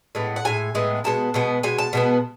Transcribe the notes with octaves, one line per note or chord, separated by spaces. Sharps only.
A2 G#3 B3
F#5
A2 G#3 G#5
A2 G#3 B3
B2 G#3 B3 A5
B2 G#3 B3
B2 G#3 G#5
A5
B2 G#3 B3